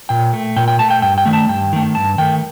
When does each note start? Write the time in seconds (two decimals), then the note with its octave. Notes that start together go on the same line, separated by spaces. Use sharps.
0.09 A#2 G5
0.33 A3
0.56 A#2 G5
0.68 G5
0.79 A3 A5
0.91 G5
1.02 G2 G5
1.18 G5
1.26 D#3 A3
1.33 A5
1.49 G2 G5
1.73 D#3 A3
1.95 G2 A5
2.18 D#3 A3 G5